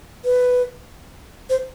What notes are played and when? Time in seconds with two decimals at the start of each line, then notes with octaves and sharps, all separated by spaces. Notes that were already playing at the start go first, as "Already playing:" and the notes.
0.25 B4
1.50 C5